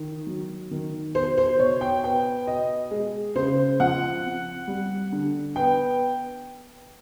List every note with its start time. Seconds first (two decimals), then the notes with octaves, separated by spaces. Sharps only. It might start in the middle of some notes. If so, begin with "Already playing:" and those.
Already playing: D#3
0.27 F#3
0.71 D#3
1.15 B2 C5
1.38 C5
1.59 B2 C#5
1.81 G5
2.04 B3 G5
2.47 B2 D#5
2.91 G#3
3.35 C#3 C5
3.80 F3 F#5
4.24 C4
4.68 G3
5.12 D3
5.56 B3 G5